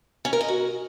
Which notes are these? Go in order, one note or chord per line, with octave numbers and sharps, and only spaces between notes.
C#4
A#4
D#5
F#4